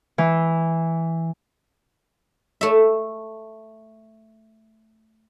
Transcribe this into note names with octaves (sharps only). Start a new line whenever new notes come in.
E3
A3 E5